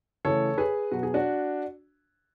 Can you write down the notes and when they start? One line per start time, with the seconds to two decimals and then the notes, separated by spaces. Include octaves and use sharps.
0.25 C#3 E3 A3 A4 C#5
0.58 G#4 B4
0.92 B2 F#3 B3 F#4
1.03 G#4
1.14 D4 F#4